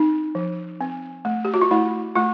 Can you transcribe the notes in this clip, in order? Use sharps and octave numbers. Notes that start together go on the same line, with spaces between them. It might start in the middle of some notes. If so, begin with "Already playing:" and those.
Already playing: C4 D#4
F3
C4
A3
G4
F#4
F4
A3 E4
A3 F4